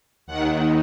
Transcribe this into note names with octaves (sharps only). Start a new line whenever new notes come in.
D#2 D#3 F#5